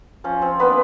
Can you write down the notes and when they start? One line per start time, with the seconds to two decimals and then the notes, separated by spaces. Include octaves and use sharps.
0.24 F3 C#4 C#5
0.41 C4 C5
0.59 A#3 B3 D4 B4